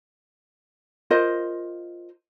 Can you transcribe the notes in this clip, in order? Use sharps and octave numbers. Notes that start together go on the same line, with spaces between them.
F4 A#4 C5 D#5